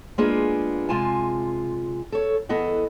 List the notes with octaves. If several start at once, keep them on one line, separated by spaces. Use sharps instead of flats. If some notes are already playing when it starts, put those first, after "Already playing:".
G#3 A#3 B3 D4 F4 G#4
C3 G#3 F4 G#5 A5
A4 C#5
E2 B3 A4 D#5 F#5